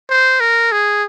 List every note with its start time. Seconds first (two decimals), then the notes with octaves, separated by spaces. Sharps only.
0.09 C5
0.40 A#4
0.72 G#4